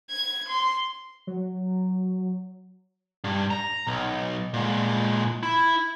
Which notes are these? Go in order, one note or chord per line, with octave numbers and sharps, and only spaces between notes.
G#6
C6
F#3
G2
A#5
B1
A#2 G#3
E4